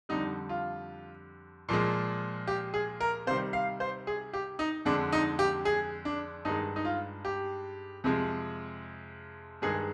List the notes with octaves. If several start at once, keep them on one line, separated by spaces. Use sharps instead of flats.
F2 D3 G3 D#4
F4
A#2 F3 G#3
G4
G#4
A#4
C3 D#3 G3 C5
F5
C5
G#4
G4
D#4
F2 D3 G#3 D4
D#4
G4
G#4
D4
G2 D#3 G#3 D#4
D#4
F4
G4
F2 C3 F3 G#3
G2 D#3 G#3 G#4